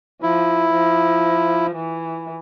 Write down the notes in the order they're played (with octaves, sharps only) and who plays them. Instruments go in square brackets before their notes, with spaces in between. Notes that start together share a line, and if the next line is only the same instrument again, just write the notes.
[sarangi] F3 [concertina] E4
[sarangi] F3
E3